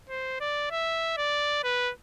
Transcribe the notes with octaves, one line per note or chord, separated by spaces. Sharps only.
C5
D5
E5
D5
B4